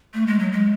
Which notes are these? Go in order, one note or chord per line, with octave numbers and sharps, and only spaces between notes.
A3
G#3
F#3
G#3